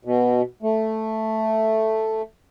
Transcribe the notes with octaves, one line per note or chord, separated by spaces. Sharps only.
B2
A3